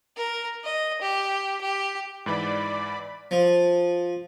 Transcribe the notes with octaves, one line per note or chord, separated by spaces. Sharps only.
A#4
D#5
G4
G4
G#2 E3 D5 B5
F3